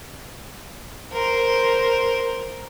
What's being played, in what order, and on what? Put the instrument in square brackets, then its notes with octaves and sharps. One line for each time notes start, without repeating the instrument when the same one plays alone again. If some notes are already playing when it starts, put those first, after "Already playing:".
[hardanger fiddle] A#4 C5